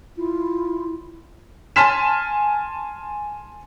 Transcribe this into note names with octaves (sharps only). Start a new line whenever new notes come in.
E4 F4
G#5 A5 C6 F6 B6 E7